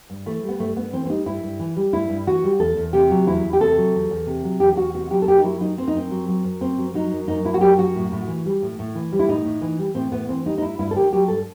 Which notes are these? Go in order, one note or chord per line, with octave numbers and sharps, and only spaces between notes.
G2
E3 A3
G3
B3
G2 A3
G2 B3
E3 C4
C4
G3 D#4
G2 E4
G2
E3
G3
G2 E4
G2
E3 F#4
G3
E2 A4
E2
C3 G4
F#3
E2 E4
E2
G4
C3 A4
F#3
E2
E2
C3
F#3
E2 G4
G4
E2 F#4
C3 F#4
F#3 G4
A4
F#2 G4
D#4
F#3 E4
F#3 D#4
F#2 C4
D#4
F#2 C4
F#3
F#3
F#2
F#2 C4
F#3
F#3 D#4
F#2
F#2 D#4
F#3 E4
F#4
F#3 G4
F#2 F#4
A2
A2
E3
G3
A2
A2
E3
G3
E4
A2 D#4
A2
E3
G3
A2 C4
A2 B3
E3 C4
G3 D#4
D#4
G2 E4
G2 E4
A4
D#3 G4
F#3 G4
G2 A4